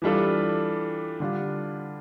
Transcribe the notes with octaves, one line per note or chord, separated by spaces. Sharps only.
E3 G3 D4 F4 A4
D3 G3 D4 F4